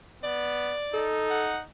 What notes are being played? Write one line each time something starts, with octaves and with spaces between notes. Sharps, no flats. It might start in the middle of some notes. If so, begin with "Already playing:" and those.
B3 D5
D#4 A4
F#5